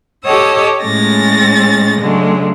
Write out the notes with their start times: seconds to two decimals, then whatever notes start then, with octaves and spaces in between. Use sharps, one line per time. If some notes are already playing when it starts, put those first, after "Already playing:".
0.24 G4 A4 C#5 D#5 D#6 E6
0.81 A2 G#3 C#4 A6 A#6
2.01 C#3 F#3 G#3 A3 D4